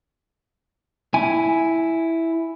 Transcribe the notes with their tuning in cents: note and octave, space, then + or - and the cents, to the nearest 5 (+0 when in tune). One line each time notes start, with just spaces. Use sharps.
E4 +0 G#5 +0